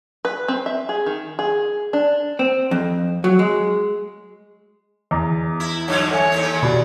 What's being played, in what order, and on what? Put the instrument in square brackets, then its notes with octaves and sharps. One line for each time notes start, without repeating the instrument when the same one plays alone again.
[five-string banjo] B4
C4
E5
G#4
D#3
G#4
D4
[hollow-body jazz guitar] C4
F2
F#3
G#3
[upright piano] E2 [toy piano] D#5 A#5
[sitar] E4
[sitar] G2 D3 F#3 [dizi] C#5 [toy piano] F5
[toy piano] A4 E5 G#5 [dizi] C#5
[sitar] D#2 C4
[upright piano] B2 [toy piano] F4 G4 B5 [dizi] D5